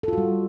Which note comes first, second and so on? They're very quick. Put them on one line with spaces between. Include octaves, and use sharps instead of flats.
A4 F4 F#4 G3